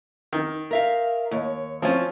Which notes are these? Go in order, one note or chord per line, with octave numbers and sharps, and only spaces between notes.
D#3
A#4 E5 F5
D#2 C#5
F3 C4 C#4 F4 C#5